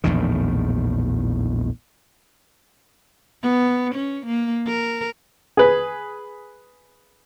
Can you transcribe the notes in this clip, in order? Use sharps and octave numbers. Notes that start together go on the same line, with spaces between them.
A#1 E2 A2 D#3
B3
C#4
A#3
A#4
G#4 B4